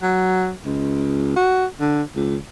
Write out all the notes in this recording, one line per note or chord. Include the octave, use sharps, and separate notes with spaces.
F#3
C#2
F#4
D3
C#2